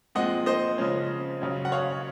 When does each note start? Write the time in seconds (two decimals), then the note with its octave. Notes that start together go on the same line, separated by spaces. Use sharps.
0.15 A#2 F3 G#3 C4 D#5 F#5
0.46 C5 D#5
0.78 C#3 F3 G#3 C#4
1.41 C#3 F#3 C#4
1.65 F#5
1.72 C#5 F5